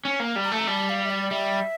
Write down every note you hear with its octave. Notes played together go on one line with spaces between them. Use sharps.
C#4
A#3
G3
A#5
A3 A5
A#5
G3 A5
F5
E5
D5
G3 E5